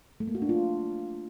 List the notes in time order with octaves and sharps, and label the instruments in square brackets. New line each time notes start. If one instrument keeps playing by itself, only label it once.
[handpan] A3
A#3
F#4
D4
F4